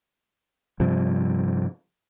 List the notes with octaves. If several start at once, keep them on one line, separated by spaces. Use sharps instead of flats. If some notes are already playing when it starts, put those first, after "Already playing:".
G2 C3 F3 G3